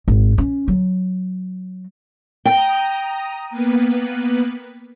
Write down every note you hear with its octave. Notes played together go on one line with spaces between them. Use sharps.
G#1
C#4
F#3
G5 A#5 D#6
A#3 B3 B4